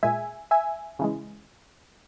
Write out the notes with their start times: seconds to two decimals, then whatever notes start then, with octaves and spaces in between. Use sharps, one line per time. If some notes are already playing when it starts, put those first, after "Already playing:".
0.03 A#2 G#3 E5 G#5
0.51 E5 G#5
0.99 C#3 E3 G#3